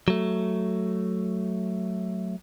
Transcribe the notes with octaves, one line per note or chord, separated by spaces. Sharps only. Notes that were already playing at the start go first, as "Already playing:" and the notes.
F#3 A3